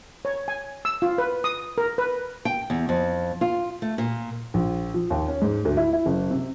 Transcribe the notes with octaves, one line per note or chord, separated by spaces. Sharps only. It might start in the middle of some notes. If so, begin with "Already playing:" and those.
C#5
G#5
E6
F4
B4
D#6
A#4
B4
G5
E2
F2
F4
A3
A#2
A#1
F3
D#2
C#4
G#2
D2
E4
E4
F#1
C3